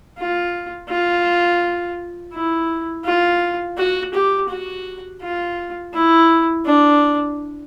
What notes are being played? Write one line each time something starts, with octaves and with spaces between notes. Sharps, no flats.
F4
F4
E4
F4
F#4
G4
F#4
F4
E4
D4